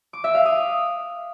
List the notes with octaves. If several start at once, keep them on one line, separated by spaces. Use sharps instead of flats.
D6
E5
F5
D#6